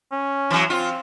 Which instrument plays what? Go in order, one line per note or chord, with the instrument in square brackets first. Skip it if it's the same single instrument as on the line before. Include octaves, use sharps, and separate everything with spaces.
[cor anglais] C#4
[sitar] E3 F#3
[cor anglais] C4 [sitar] F4